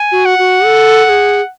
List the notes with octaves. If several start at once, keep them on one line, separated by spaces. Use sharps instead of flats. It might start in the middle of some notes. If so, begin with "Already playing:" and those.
Already playing: G#5
F#4
F#5
F#4
A4
A4
G#4